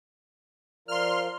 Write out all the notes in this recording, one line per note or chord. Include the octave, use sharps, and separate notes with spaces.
F3 F4 A#4 D5 C6 F6